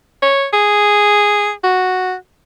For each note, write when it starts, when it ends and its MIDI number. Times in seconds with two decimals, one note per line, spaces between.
0.23 0.46 73
0.53 1.51 68
1.64 2.14 66